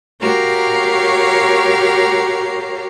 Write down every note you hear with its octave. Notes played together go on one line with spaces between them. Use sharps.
F#4 G4 A#4 C#5 F5 A#5